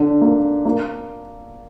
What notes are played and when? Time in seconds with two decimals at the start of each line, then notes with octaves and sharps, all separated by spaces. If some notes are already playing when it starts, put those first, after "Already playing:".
Already playing: D3
0.21 A#3
0.65 A#3